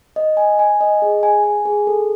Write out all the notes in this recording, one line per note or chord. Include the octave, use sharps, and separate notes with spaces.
D#5
G#5
G#5
D#5
G#4
G#5
G#5
G#4
A4